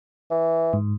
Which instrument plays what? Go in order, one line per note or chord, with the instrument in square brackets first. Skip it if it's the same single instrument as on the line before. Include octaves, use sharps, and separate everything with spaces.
[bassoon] E3
[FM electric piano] G#2